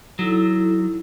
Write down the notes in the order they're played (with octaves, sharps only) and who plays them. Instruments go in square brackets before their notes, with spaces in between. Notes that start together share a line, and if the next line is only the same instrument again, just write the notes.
[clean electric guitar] F#3 [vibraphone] D#4 E4 A4